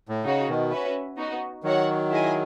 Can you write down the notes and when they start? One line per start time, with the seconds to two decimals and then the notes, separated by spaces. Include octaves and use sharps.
0.09 A2
0.25 C#3 D#4 F#4 C#5
0.48 B2 D#3
0.71 C#4 F#4 B4 E5
1.17 B3 D#4 F#4
1.63 D#3 F#3 F#4 C#5 F#5
2.10 E4 G#4 D#5 G#5